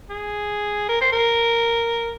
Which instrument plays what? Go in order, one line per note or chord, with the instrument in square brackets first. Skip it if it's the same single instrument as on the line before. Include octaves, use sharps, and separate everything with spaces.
[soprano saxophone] G#4
A#4
C5
A#4